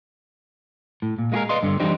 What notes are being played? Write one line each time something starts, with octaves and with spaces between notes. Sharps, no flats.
A2
A#2
G#3 A#3 F4 G4 G#4 A#4
B4 D5 D#5 F5 C6
G2 D3
E3 G3 D4 D#4 G4 C5